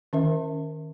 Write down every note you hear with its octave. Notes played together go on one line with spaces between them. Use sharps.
D#3 C#4 A#4 E5